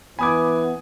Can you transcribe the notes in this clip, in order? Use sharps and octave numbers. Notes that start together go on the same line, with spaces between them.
E3 B3 G#5 B5 D6 D#6 G#6